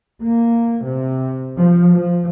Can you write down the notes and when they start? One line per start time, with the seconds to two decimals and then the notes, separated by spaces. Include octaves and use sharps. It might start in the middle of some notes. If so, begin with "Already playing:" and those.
0.22 A#3
0.84 C3
1.56 F3
1.92 F3